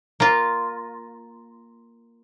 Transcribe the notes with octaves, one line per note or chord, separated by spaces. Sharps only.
A#3 F4